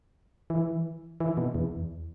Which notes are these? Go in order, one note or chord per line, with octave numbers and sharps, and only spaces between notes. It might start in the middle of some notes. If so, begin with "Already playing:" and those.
E3
E3
B2
E2